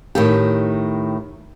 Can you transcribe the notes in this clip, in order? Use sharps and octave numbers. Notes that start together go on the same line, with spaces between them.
A2 D#3 G4